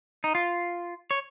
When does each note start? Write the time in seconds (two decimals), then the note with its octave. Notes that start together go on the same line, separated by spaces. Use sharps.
0.24 D#4
0.35 F4
1.11 C#5